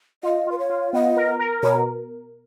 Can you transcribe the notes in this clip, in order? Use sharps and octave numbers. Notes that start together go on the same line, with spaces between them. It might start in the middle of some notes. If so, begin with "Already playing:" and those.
F4 D#5
F4 B4
C#5
F4
B3 D#5
A#4
A#4
B2 C#5